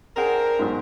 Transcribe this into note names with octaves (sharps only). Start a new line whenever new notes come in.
C4 D4 G#4 A#4 F#5
B1 G#2